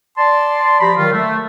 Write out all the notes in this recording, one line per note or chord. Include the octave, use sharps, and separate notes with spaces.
D5 A5 C6
F3 G4 D5 A#5 B5
D#3 F#3 F4
A3